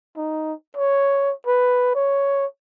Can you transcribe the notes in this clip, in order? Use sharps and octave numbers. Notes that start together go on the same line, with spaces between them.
D#4
C#5
B4
C#5